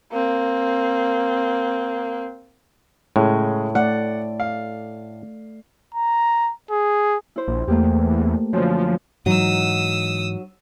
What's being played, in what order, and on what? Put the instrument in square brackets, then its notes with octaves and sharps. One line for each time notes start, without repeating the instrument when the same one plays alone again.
[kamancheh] A#3 C4
[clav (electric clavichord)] A2 [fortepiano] C#3 G#3
[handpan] A3 D5 [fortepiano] F#5
[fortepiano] F5
[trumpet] A#5
G#4
[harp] E4 C5
[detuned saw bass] A#1
[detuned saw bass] E2 [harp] A3 A#3 G4
[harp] F#2 D3 [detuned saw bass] F3
[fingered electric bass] G#2 E3 [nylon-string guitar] F#3 D#4 F#4 [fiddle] D#6 E6